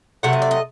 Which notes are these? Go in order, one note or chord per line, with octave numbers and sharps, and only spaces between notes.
C3 F#3 A3 F#5
D#5
D5
D#5